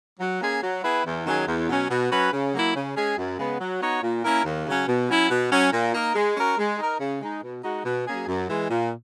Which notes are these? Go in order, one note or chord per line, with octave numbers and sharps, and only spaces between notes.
F#3
A#3 C#4 G#4
F#3
B3 E4 G#4 B4
E2
D#3 F#3 C#4 G#4
E2
B2 F#3 C#4
B2
F#3 C#4 F#4 B4
C#3
F#3 A#3 E4
C#3
G#3 C#4 G#4
F#2
C#3 G#3 B3
F#3
B3 D#4 F#4 C#5
A#2
A#3 C#4 E4 A#4
D#2
C#3 F#3 C#4
B2
F#3 C#4 E4
B2
F#3 C#4
A#2
A#3 D#4 A#4
G#3
C#4 F#4 A#4
G#3
D#4 A#4
C#3
G#3 D#4
B2
G#3 D#4 F#4
B2
F#3 A#3 C#4 G#4
F#2
E3 G#3
A#2